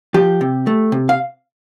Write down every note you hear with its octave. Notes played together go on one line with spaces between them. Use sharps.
F3 G4
C3
A3
C3
F5